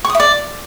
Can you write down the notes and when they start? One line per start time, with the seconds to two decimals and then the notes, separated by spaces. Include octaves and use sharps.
0.05 C#6
0.10 D#6
0.15 E5
0.20 D5